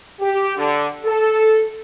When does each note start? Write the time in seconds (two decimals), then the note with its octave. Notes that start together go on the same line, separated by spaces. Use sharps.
0.20 G4
0.57 D3
1.04 A4